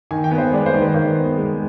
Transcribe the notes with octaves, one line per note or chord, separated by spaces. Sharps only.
D#3 G#5
G5
B3 B4
C5
G#3 D5
C5
D#3
B4
D#3 C5
B3
G#3